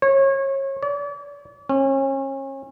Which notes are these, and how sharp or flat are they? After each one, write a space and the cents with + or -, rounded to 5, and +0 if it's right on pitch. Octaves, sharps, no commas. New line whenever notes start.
C#5 -30
D5 -40
C#4 -35